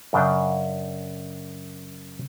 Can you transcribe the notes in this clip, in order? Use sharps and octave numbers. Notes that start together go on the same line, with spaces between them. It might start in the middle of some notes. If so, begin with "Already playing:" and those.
F#2 C#3 D4 F5 G5